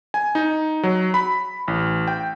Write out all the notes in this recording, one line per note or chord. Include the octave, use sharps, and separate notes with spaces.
G#5
D#4
F#3
B5
A1
G5